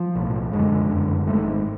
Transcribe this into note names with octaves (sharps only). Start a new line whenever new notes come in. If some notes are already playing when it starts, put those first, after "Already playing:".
Already playing: F3
B1 A2
F#1 F#2 D3 G#3
F#1 F#2 D3
G#1 G#2 A3
G#3